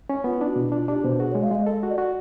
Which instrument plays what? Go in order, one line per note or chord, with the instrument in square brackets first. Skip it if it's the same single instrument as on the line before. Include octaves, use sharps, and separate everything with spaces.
[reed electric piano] C#4
[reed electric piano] B3 [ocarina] F4
[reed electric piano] D4 [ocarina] E4
[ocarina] F#4
[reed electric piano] B2 [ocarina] E4
[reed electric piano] D4 [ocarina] F4
[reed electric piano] D4 [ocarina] G4
[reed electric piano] B2 [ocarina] C5
[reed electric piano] F#4 [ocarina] G#4
[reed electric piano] G#3 [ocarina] C#5
[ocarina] F5
[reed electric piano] G#3 [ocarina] D#5
[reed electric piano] A4 [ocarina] D#5
[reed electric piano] F#4
[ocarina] D5
[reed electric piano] F#4